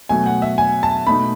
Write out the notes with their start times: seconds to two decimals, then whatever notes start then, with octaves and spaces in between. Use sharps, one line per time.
0.09 B2 F#3 A3 G#5
0.26 F#5
0.42 E5
0.58 G#5
0.83 A5
1.07 B2 A3 D#4 B5